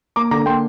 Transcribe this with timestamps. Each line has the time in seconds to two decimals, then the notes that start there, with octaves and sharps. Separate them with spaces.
0.16 A#3 A#5 D6
0.31 D3 A#5 D6
0.46 A#3 G5 C6